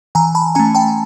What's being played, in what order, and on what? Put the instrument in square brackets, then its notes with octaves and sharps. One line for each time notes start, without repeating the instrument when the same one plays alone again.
[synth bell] E3 G#5 A#5
A5 B5
A3 C#4 G#5 A#5
G5 A5